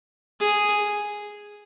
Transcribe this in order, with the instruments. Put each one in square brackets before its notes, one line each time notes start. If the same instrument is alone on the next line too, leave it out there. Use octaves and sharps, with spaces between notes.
[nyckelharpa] G#4